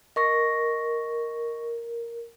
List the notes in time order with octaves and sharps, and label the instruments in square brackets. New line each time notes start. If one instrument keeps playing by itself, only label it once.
[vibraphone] A#4 [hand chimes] D#5 C#6 A#6